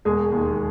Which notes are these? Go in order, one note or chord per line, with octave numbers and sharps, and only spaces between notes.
E1 G#3 G#4
D#2 D#3